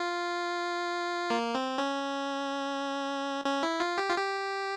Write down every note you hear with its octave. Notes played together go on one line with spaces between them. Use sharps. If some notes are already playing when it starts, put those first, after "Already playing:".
Already playing: F4
A#3
C4
C#4
C#4
E4
F4
G4
F4
G4